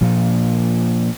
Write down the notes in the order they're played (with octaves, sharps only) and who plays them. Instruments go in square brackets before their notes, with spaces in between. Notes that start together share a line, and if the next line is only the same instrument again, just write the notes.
[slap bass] A#2 F3 A#3